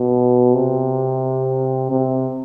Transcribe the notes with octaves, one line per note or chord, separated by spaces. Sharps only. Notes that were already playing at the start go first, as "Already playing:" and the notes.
Already playing: B2
C3
C3